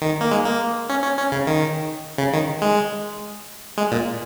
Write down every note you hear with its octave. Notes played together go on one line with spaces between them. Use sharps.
D#3
A#3
G#3
A#3
C#4
C#4
C#4
C#3
D#3
C#3
D#3
G#3
G#3
A#2